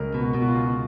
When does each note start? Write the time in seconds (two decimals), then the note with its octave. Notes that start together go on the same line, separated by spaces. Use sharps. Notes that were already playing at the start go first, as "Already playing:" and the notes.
Already playing: C#2 F#4 A#4
0.14 B2
0.20 F#4
0.34 B2
0.42 F#4
0.48 F4
0.55 C#2
0.65 F4